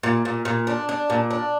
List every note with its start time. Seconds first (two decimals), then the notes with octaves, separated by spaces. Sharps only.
0.03 A#2
0.25 A#2
0.45 A#2
0.67 D4
0.89 D4
1.10 A#2
1.31 D4